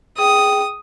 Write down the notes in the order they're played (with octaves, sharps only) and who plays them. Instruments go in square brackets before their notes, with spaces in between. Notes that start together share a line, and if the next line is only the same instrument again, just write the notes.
[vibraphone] G#4 G5 [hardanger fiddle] D#6